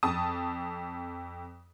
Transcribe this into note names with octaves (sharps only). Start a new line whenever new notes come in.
F2 A5 D#6